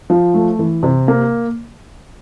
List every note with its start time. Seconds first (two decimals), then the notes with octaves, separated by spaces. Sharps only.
0.10 F3
0.34 A3
0.59 E3
0.83 C3
1.08 A#3